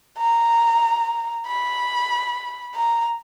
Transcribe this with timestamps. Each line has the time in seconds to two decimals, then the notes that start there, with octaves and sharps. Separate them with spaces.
0.18 A#5
1.46 B5
2.75 A#5